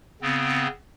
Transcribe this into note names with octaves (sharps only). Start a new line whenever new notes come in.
C#3 B3 C4